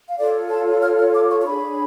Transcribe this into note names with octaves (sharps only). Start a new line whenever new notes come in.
F5
F4 A4 C#5 D5
A5
F6
F6
D6
C#6
C#6
D4 G#4 C#5 B5